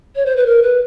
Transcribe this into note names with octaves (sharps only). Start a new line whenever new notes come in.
C#5
C5
B4
A#4
B4